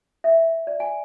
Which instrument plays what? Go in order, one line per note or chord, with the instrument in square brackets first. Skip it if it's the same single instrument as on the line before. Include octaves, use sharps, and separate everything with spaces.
[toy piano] E5
D5
G#5